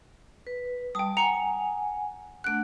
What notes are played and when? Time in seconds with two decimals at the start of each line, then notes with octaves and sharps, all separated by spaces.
0.47 B4
0.95 G3 G5 A5 D#6
1.17 F#5 G#5 A#5 C#7 F7
2.44 A3 D4 F#5 F#6 D7